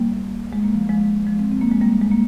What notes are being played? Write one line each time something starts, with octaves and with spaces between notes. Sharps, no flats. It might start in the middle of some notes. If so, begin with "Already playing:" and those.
Already playing: G3 A#3
G#3
A#3
F3 G#3
F3 G#3
F3 G#3
G#3 C4
C4
A#3
G#3
G3 A#3
G#3
A#3